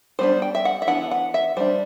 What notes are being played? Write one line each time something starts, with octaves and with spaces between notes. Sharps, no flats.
G3 B3 D4 C5
G5
E5
F#5
E5
E3 B3 D4 F#5
F#5
E5
G3 D4 C5